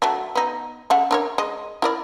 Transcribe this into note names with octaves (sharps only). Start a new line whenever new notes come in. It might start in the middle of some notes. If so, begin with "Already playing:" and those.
F#3 A3 D4
B3 D#4
C#3 A3 F#5
D4 A#4 C#5
G#3 D#5
E4 A#4 D5